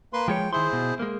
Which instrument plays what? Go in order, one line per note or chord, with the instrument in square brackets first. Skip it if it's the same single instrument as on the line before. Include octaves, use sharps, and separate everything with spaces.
[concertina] A#3 B4 C6
[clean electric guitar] F3 G#3 C#5 [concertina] G5
[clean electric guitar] D#3 C6 [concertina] E4 G#4 C5
[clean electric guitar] B2
G#3 A#3